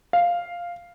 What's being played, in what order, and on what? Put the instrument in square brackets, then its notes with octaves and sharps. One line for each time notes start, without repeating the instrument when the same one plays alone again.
[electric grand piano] F5